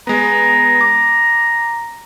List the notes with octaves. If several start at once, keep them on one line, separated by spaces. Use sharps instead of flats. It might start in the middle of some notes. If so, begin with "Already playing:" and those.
G#3 B3 A#5
D6